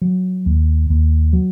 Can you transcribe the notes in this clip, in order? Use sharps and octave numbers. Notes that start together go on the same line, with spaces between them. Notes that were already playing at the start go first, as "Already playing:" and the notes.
F#3
D#2
D#2
F#3